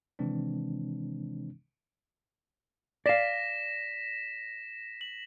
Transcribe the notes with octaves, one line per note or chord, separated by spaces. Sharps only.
C3 D#3 E3 G#3 C4 D4
D5 F5 A#6 B6 E7
F#7